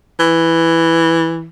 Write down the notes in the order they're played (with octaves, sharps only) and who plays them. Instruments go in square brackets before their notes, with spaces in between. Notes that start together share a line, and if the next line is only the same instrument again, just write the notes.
[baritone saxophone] E3